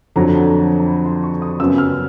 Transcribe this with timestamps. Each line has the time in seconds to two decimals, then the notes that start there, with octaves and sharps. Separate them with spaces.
0.16 F2 D3 F#3 A#5
0.79 A#5
0.87 B5
1.06 C6
1.24 C#6
1.42 D#6
1.60 F#2 C#3 F#3 B3 E6
1.78 F6